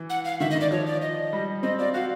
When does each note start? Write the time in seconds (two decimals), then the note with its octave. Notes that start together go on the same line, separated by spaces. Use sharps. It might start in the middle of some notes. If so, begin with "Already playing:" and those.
Already playing: E3
0.10 F#5
0.25 F5
0.40 D#3 E5
0.51 D#5
0.55 D#3
0.61 D5
0.71 F3 C#5
0.86 D5
1.02 D#5
1.33 G3
1.63 C4 D#5
1.79 F4 D5
1.94 F#4 F5